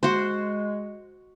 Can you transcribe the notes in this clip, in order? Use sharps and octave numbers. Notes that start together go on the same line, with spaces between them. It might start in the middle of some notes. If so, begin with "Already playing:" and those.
G#3 F#4 C5